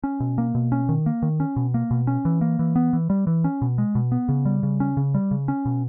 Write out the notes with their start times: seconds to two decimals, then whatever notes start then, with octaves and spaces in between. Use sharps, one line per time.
0.04 C#4
0.20 B2
0.38 A#3
0.55 B2
0.72 C#4
0.89 D#3
1.06 A#3
1.22 D#3
1.40 C#4
1.56 B2
1.74 A#3
1.91 B2
2.07 C#4
2.25 E3
2.41 A#3
2.59 E3
2.76 B3
2.93 E3
3.10 G3
3.27 E3
3.44 C#4
3.62 B2
3.78 G#3
3.95 B2
4.12 B3
4.29 C#3
4.45 G3
4.63 C#3
4.80 C#4
4.97 C#3
5.14 G3
5.31 C#3
5.48 C#4
5.65 B2